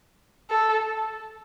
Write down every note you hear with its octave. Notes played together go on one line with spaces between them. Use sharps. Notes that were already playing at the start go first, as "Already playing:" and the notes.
A4